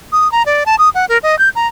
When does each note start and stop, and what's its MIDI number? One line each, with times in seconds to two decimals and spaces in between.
0.12 0.31 87
0.32 0.45 82
0.46 0.64 74
0.66 0.76 81
0.79 0.89 87
0.95 1.06 78
1.09 1.18 70
1.23 1.38 75
1.39 1.49 91
1.55 1.67 82